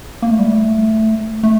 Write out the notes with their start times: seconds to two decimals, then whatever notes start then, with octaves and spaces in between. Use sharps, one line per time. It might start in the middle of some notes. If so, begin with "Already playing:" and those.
0.22 A#3
0.31 A3
0.39 G3
0.47 A3
1.43 A3